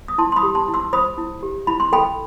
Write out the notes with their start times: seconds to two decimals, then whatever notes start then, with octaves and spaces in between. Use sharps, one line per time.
0.08 D#6
0.18 E4 A5 C6
0.32 C6
0.36 B5 D#6
0.43 G4
0.55 A5 C6
0.68 E4
0.74 C6 E6
0.93 C5 B5 D#6
1.18 E4
1.43 G4
1.67 E4 B5
1.80 C6
1.92 A4 G5 B5